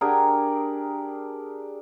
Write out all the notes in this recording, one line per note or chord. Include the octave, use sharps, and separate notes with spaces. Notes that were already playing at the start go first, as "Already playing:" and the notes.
D4 G4 G#4 A#4